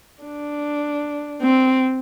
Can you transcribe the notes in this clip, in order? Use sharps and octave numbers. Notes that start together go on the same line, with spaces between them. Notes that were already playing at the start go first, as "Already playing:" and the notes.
D4
C4